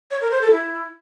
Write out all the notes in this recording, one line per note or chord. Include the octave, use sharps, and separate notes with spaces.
C#5
A#4
C5
A4
E4